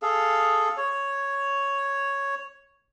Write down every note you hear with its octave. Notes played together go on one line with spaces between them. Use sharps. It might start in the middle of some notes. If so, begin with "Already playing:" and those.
G#4 A4 F5
C#5